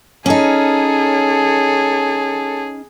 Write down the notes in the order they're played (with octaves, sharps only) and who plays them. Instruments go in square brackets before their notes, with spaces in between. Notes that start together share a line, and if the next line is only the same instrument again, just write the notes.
[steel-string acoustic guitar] C#4 D#4 [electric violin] G#4 [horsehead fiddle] A4 C#5